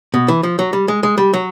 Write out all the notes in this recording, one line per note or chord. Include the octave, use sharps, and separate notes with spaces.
B2
E3
F3
F#3
G3
G#3
G#3
G3
F#3